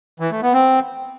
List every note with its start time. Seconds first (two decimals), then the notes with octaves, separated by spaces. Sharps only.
0.20 E3
0.31 A3
0.42 B3
0.53 C4